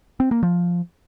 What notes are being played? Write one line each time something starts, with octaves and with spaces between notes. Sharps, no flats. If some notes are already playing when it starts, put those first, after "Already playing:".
C4
A#3
F3